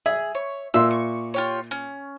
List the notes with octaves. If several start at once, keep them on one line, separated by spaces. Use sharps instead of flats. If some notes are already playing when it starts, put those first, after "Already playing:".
G#4 E5
C#5
A#2 E5 C6 E6
C#6
F4 G4 C#5
C#4